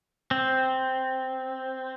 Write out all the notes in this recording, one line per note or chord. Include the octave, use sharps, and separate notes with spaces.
C4